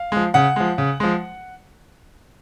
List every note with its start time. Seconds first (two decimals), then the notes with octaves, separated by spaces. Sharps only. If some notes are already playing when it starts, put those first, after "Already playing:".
Already playing: F5
0.12 F3 G#3
0.34 C#3 F#5
0.56 F3 G#3
0.78 C#3
1.00 F3 G#3